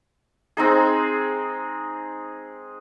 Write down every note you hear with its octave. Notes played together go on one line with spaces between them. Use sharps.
G#3 C4 D#4 G#4